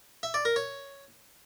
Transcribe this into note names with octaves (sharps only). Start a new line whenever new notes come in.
E5
D5
A#4
C#5